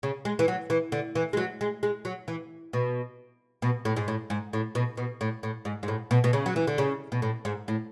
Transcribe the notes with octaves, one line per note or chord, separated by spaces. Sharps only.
C#3
G#3
E3
F#3
E3
D3
E3
G#3
F#3
G#3
G#3
F#3
E3
B2
B2
A2
G#2
A2
G#2
A2
B2
B2
A2
A2
G#2
G#2
A2
B2
B2
C#3
F#3
E3
D3
C#3
B2
A2
G#2
A2